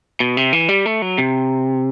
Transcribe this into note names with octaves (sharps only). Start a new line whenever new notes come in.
B2
C3
E3
G3
A3
F#3
C3